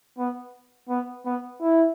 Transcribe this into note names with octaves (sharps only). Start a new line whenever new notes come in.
B3
B3
B3
E4